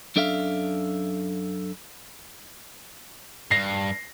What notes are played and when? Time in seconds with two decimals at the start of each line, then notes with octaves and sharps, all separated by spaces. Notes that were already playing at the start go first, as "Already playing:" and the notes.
0.16 F#2 D4 A4 E5 F5
3.51 G2 A#6 C7